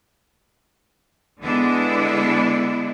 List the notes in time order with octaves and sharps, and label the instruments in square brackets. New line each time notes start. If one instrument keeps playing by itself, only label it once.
[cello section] D3 G#3 B3 D4 E4